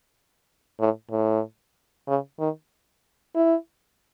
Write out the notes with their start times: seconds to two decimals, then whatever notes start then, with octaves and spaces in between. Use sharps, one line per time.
0.80 A2
1.11 A2
2.08 C#3
2.39 D#3
3.35 E4